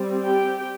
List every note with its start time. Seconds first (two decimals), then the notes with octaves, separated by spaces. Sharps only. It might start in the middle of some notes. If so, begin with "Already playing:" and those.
Already playing: G3 C4
0.23 G4 G5